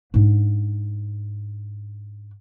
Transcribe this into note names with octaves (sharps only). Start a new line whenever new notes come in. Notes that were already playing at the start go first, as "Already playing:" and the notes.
G#2 D4